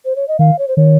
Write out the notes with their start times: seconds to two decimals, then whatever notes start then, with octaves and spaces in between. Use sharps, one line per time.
0.05 C5
0.16 C#5
0.28 D#5
0.39 D#3 F5
0.59 C#5
0.68 C5
0.77 D#3 C#5